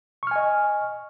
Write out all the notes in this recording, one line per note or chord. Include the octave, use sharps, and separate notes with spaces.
D#5 G#5 C#6 F6